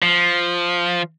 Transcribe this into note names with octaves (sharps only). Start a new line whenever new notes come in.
F3